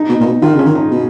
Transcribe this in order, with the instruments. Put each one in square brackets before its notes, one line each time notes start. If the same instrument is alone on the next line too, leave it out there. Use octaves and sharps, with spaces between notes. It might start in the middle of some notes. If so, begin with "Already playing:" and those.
Already playing: [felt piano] D#4
[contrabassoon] B2
A#2
B2
[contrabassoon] D#3 [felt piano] F4
[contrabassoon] C#3 [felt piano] C#4
[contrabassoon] D#3
[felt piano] D#4
[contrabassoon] B2